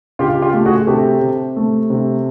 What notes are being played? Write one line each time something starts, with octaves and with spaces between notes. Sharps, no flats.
C#2 F4 G4
F4 G4
A3
F#4 G#4
C3 G4 A4
C3
A3
C3